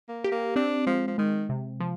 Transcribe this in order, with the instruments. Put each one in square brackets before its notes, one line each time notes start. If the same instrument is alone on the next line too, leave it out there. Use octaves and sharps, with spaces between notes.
[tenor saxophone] A#3
[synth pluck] G4
[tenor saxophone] A#3
[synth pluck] C4 [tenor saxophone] D4
[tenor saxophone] F3 [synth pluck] G#3
[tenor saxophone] F3
[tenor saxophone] D#3 [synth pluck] G#3
[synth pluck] C3
F3